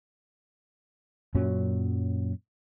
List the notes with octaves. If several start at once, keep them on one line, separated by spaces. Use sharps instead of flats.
F#2 A#2 F#3 C#4